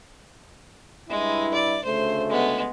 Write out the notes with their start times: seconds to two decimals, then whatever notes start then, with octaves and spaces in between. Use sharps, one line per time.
1.09 G2 G#3 E4
1.54 D5
1.84 D2 C#3 A3 C5
2.30 G#3 B3